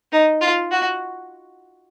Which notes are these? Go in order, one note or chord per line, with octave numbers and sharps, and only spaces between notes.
D#4
F4
F#4